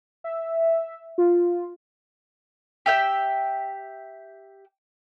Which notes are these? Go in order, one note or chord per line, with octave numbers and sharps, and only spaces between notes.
E5
F4
G4 E5 G5